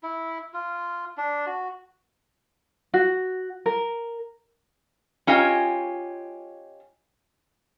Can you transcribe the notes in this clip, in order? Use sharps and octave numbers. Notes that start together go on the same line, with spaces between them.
E4
F4
D4
F#4
F#4
A#4
C#4 F4 G4 D#5 G#5